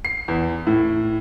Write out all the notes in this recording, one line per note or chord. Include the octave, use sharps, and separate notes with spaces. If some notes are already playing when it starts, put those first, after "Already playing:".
C7
E2
A2